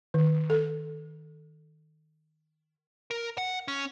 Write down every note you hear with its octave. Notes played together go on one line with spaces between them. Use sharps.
D#3
A4
A#4
F#5
C#4